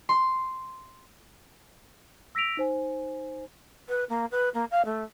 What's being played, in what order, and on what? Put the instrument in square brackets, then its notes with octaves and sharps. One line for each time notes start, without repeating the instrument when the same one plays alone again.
[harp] C6
[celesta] E6 A#6 B6 D7 F7
D#4 C5 G#5
[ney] B4
A#3
B4
A#3
F5
A3